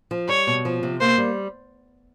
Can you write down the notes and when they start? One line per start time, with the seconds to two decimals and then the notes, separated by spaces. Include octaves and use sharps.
0.11 F3
0.28 G3 C#5
0.47 B2
0.65 F3
0.83 C3
1.01 A#3 C5
1.18 G3